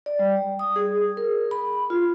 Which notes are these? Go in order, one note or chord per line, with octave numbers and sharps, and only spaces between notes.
D5
G3
D#6
G#4
A#4
B5
F4